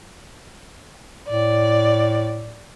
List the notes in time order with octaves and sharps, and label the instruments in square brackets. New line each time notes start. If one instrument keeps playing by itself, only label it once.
[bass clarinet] A2 [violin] D5